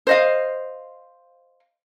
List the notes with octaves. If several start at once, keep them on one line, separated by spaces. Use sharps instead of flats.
C5 D#5 F5